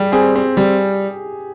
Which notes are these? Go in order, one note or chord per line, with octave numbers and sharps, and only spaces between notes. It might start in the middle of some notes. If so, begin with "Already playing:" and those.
Already playing: G3 G4 G#4
C4 G#4
C4
G3